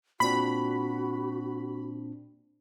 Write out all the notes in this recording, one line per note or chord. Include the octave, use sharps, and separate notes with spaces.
A#2 C4 D4 F#4 B5